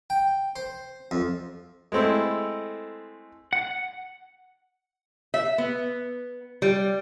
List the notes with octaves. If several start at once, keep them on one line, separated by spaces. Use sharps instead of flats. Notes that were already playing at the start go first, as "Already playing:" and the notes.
G5
C5
F2
G#3 A3 C4 E4 A4
F#5
E5
B3
G3